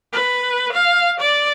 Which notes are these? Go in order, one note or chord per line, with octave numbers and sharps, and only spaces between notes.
B4
F5
D5